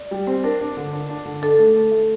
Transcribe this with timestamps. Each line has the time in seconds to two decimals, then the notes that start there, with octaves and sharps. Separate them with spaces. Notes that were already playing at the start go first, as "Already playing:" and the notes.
Already playing: D5
0.11 G3
0.27 C4
0.44 D4 A#4
0.61 D4
0.77 D3
0.93 D4
1.09 D4
1.25 D3
1.42 D4 A4
1.59 A3
1.76 A3
1.92 A3